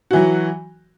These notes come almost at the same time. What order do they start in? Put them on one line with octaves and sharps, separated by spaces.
F#4 E3 F#3